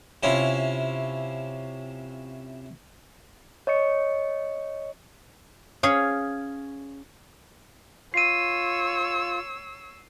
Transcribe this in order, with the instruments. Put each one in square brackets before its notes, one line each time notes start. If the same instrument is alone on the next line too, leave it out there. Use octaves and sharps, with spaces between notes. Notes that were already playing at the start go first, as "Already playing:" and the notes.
[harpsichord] C3 C#4 E4 F4
[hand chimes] C#5 D#5 C#6 C#7
[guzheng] C#4 G#4 C#5 F5
[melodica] F4 [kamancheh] C#5 E6 [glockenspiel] C7 D#7